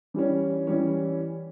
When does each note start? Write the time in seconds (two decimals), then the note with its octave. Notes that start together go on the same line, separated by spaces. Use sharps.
0.14 E3 G3 C#4
0.67 E3 G3 C#4